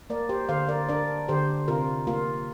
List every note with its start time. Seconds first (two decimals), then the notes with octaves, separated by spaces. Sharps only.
0.10 A#3 A#4 D5
0.29 G4 C5
0.49 D3 C5 F5
0.68 A#4 D5
0.89 D4 A#4 D5
1.28 D3 G4 C5
1.68 C3 F4 A#4
2.07 A#3 F4